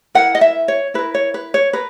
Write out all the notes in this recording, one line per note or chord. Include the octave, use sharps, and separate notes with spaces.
E4 A#4 F#5
D#5
E5
C#5
E4 A#4 B4
C#5
B4
C#5
A#4 B4